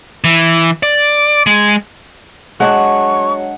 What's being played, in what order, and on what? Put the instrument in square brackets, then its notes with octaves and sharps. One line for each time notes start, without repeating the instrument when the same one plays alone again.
[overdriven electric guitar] E3
D5
G#3
[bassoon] F#3 [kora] G#3 D4 [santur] F#5 [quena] C#6